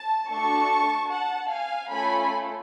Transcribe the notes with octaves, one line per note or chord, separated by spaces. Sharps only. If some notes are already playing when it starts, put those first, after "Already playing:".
Already playing: A5
A3 D4 F#4 A4 A5 C#6
F#5 A5
F5 G#5
A3 C#4 F4 A4 G#5 B5